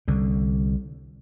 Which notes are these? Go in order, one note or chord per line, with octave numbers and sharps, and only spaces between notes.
C2 D3